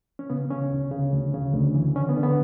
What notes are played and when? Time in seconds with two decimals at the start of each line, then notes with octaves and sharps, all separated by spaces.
0.19 C#4
0.30 C#3 B3
0.50 C#3 C#4
0.72 D2
0.91 C#3
1.12 D2
1.34 C#3
1.53 D2
1.75 E3
1.95 D3 C#4
2.09 B3
2.17 D3
2.23 B3